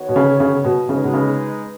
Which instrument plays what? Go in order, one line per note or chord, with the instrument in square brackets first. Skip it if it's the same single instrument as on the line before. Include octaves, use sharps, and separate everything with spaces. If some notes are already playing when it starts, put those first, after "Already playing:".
Already playing: [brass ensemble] D#3 B3 F#4 C#5
[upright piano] B2
C#3
C#3
B2
[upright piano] C#3 [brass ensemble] G#3 D#4 B4
[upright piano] B2
C#3